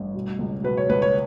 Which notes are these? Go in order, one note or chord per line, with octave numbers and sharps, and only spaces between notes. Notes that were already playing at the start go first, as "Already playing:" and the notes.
Already playing: A1 G2
B2
C#2
B2 B4
C#5
C#2 B4
C#5